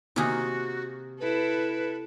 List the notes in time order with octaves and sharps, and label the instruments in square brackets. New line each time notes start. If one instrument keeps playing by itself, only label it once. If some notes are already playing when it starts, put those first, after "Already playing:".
[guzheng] C3 G#4 [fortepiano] D#3 A#3 G#5 [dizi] F#4
[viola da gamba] E4 A4 [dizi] B4